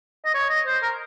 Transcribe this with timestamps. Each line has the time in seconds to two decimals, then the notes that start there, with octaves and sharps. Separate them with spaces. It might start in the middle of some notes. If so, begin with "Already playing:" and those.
0.25 D#5
0.34 C#5
0.50 D#5
0.66 C5
0.83 A#4